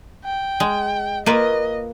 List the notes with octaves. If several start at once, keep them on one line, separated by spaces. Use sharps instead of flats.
G5
G#3
A#3 F4 B4 D#5